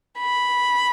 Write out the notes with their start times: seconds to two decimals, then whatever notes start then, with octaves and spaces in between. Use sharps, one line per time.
0.19 B5